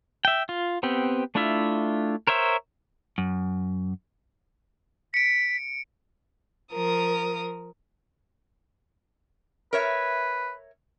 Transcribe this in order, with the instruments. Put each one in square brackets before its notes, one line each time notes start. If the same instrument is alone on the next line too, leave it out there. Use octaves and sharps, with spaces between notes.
[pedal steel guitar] E5 G5
F4
B3 C4 G4
A3 D4 E4 F4 E5
A#4 C5 C#5 E5
[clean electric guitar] F#2
[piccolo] B6 [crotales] C#7 D7
[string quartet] F3 A#4 D#6
[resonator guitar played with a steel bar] A#4 C#5 E5 [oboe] B4